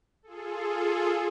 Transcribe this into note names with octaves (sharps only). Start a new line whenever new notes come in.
F4 G#4 A4